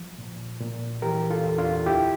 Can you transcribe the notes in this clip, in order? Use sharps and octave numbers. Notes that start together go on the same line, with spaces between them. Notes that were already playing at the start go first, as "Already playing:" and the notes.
Already playing: F3
A#2
A#2
E3 G4 A#4
F4 A4
E2
D4 F4
D2 E4 G4